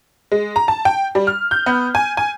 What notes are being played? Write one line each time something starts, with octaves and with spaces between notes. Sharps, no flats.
G#3
A#5
A5
G5
G3
F6
G6
B3
G#5
G#5